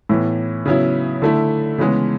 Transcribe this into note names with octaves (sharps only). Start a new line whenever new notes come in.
A2 E3 B3
C#3 F#3 B3 E4
D3 A3 E4
C#3 E3 G#3 B3